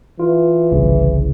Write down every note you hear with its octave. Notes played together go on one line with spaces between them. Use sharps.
E3 F4
G1 C2 C#3